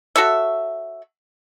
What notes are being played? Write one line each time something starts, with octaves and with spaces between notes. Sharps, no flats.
F#4 A4 C#5 E5